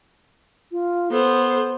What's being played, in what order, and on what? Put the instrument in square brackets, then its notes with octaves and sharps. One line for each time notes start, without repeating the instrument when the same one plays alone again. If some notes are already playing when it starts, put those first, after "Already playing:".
[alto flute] F4
[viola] B3 C5 [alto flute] A4